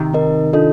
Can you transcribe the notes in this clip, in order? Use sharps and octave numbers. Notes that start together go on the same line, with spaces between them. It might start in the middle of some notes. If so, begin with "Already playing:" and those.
Already playing: C3 D#3
C4 D#4 A#4 D#5
D4 F4 A4 D#5